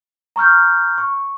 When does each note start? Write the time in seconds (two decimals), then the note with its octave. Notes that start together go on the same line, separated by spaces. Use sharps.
0.36 A#5 C#6 F6 G6
0.98 C#6